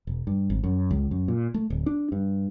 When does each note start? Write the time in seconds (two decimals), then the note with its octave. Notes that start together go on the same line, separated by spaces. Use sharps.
0.07 E1
0.27 G2
0.50 G#1
0.64 F#2
0.91 C#2
1.11 F#2
1.28 A#2
1.54 A3
1.70 D1
1.86 D4
2.12 G2